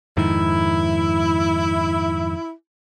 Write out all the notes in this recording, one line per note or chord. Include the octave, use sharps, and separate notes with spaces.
F2 G#2 D#3 E4